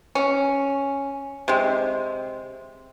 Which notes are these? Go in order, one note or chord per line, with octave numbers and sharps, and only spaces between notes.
C#4
C3 G#3